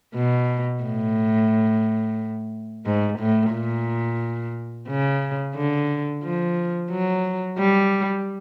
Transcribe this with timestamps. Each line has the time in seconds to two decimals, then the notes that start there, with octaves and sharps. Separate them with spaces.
0.15 B2
0.83 A2
2.86 G#2
3.20 A2
3.53 A#2
4.88 C#3
5.55 D3
6.23 F3
6.91 F#3
7.58 G3